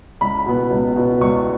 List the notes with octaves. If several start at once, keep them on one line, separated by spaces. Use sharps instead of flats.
C#2 B5
B2 B3
C#2
B2 B3
C#2 C#6